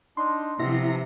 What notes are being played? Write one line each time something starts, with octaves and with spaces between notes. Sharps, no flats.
D4 D#4 C6
C3 F3 B3 E4 A#5